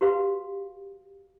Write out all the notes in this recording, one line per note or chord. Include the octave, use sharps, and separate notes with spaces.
F#4 G4 B4 F5